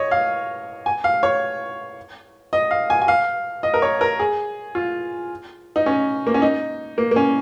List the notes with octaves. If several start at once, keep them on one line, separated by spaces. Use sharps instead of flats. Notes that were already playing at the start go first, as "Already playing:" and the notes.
Already playing: C#5 D#5
F5
G#5
F5
C#5
D#5
F5
G#5
G#5
F5
D#5
A#4
C#5
A#4
G#4
F4
D#4
C#4
A#3
C#4
D#4
A#3
A#3
C#4